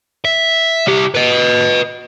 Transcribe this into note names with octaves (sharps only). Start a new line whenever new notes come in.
E5
C2 G4
B4 D#5